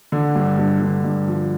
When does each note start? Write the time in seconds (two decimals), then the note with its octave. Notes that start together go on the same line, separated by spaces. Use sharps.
0.12 D3
0.35 G2
0.58 G2
0.81 D3
1.04 G2
1.28 F3